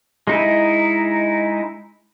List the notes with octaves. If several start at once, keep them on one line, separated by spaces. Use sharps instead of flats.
G#3 D#4 E4